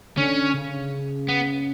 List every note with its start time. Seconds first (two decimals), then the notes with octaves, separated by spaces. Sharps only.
0.17 D3 C#4
0.54 C#3
1.29 B3